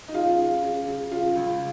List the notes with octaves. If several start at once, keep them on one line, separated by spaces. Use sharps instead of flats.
D#4
C#3 F4
C#3
C#3
C#3
C#3 F4
C#2